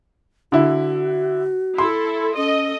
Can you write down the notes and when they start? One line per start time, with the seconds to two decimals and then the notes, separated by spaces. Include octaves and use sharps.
0.52 D3 E4 F#4
1.78 E4 A4 C6
2.37 C#4 A4 D#5